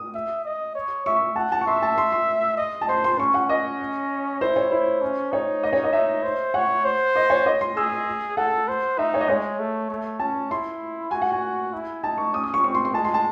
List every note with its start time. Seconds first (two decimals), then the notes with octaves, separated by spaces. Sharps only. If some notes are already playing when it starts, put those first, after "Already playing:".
Already playing: D#6
0.14 E5
0.45 D#5
0.75 C#5
1.06 E5 C#6
1.36 F#5 A5
1.52 A5
1.61 C#6
1.66 E5 C6
1.82 A5
1.98 C6
2.12 C6
2.57 D#5
2.81 A5
2.88 C5 C6
3.04 C6
3.18 C#4 C#6
3.34 F#5
3.49 D#5
4.41 E4 C5
4.56 C#5
4.71 E4 C5
5.02 C#4
5.32 D#4 C#5
5.63 D#5
5.73 C#5
5.84 D#5
5.93 D#4 E5
6.23 C5
6.54 C#5 F#5
6.85 C5
7.16 D#5
7.30 C#5
7.46 D#5
7.61 C6
7.76 G#4 E6
8.37 A4 F#5
8.68 C5
8.98 D#4 E5
9.14 C#5
9.21 D#5
9.29 G#3 C#5
9.59 A3
9.90 A3
10.19 C#4 A5
10.50 E4 C6
11.11 F#4 G#5
11.22 F#5
11.32 G#5
11.73 E4
12.03 D#4 A5
12.18 C#6
12.33 C#4 D#6
12.44 D#6
12.54 C#6
12.64 C4 C#6
12.75 C6
12.85 C6
12.94 G#3 A5
13.05 C6
13.14 A5